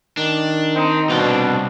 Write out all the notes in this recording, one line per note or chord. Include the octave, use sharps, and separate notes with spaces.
D#3 D4
C4 D#4
C2 B2 C4 D4 F4